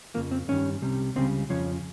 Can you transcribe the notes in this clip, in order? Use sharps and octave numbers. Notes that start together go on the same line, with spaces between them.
F2 C#3 F3 A#3
C4
G2 D#3 G3 C#4
C2 C3 G3
C#2 C#3 G3 C4
F2 C#3 F3 C#4